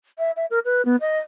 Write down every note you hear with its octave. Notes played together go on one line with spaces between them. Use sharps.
E5
E5
A#4
B4
B3
D#5